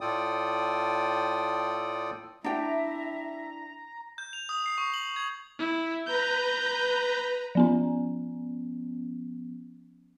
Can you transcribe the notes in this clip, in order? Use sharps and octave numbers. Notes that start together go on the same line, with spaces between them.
A2 F4 A4 D5 G5 D#6
D4 E4 E5 G5 A#5
G6
F7
D#6
C7
C#6
F#7
G#6
E4
B4 A#5 G6
F3 B3 C#4